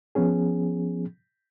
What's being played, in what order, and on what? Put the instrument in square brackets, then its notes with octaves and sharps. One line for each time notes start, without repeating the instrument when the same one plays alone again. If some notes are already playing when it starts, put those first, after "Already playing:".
[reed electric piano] F3 B3 C#4 G#4